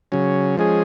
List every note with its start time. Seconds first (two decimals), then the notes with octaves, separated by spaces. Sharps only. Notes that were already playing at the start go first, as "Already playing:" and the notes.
0.12 C#3 F#3 C#4
0.57 F3 G#3 C#4 G#4